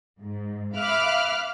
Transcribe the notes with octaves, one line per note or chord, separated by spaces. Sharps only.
G#2
E5 F5 B5 D6 F6 F#6